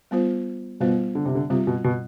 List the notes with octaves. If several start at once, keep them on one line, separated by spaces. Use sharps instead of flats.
G3 B3 F4 C5
B2 G3 B3 F4 C5
D3
C3
D3
C3 G3 C4 F4
B2
B2